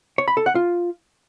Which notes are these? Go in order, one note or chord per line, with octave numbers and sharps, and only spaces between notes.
C#5
B5
A4
F#5
F4